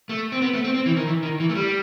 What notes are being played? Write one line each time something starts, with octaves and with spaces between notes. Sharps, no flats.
A3
C4
B3
A3
C4
C4
E3
D#3
E3
D#3
E3
A3
G3